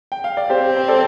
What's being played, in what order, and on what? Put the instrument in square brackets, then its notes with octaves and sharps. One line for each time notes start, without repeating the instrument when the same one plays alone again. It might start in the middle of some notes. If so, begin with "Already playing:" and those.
[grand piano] G5
F5
D5
[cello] C4 [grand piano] G4 C5
[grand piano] C5
A4 D5